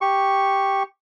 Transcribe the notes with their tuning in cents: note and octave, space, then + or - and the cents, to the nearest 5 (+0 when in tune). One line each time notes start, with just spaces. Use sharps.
G4 +0 C#6 +0